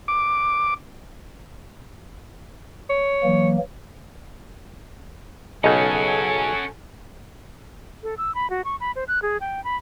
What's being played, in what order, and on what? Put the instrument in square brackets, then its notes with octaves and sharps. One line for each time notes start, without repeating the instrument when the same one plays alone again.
[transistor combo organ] D6
[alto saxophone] C#5
[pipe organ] E3 F#3 A#3
[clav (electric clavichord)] B1 C#3 [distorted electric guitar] C#4 F#4 [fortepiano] G#4 D#5 [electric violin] A4 G#5
[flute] A4
E6
B5
F#4
C#6
B5
C5
F#6
G#4
G5
B5